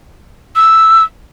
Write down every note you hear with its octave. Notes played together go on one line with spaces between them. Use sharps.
E6